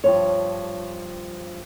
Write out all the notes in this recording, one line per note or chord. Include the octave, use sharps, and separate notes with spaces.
G2 F3 C#5